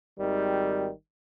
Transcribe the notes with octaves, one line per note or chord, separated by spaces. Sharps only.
G#1 D#3 G3